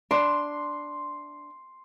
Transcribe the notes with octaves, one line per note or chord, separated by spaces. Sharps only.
D4 C6